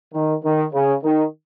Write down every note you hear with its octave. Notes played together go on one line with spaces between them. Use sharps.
D#3
D#3
C#3
D#3